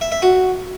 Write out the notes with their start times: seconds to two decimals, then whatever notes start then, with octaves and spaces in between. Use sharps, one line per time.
0.01 E5
0.12 E5
0.22 F#4